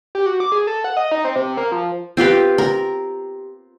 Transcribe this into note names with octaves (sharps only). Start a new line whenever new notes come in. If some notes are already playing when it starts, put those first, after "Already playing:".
G4
F#4
D6
G#4
A4
F#5
D#5
D#4
C4
C3
A#3
F3
C4 F4 G4 B4
A#4